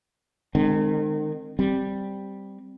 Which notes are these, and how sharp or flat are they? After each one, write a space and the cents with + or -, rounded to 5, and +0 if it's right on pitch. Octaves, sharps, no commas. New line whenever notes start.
D#3 -35 G#3 +0 C4 +0
G3 +0 C4 +0